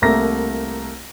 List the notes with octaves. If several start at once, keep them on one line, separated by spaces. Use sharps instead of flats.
C2 A3 A#3 A#5 A#6